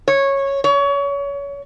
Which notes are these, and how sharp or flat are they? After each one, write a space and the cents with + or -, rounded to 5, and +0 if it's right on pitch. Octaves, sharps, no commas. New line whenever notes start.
C#5 -10
C#5 +30